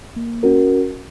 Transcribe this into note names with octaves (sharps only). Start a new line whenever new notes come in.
A#3
C#4 F#4 A#4